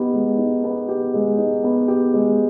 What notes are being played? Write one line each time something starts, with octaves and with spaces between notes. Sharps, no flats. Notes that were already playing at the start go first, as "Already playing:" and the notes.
Already playing: B3 D#4 G4
G#3
D#4
B3
G4
G#3
D#4
B3
G4
G#3